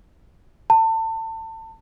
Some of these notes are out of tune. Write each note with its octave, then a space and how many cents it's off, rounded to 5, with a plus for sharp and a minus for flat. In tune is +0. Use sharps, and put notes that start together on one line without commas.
A5 +30